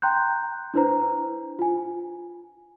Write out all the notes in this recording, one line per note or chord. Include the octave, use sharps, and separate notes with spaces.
G5 A#5 C6 F#6 G6
D4 E4 B4 C5 A#5
F4 G#5